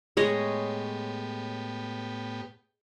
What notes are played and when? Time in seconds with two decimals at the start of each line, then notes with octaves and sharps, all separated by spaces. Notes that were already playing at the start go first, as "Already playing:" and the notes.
0.17 A2 G#3 B3 G4 C#5 D#5